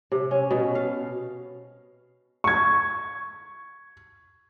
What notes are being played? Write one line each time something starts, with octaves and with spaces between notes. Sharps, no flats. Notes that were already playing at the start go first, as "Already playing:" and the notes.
C3
C#4
B2
F5
C#6 G#6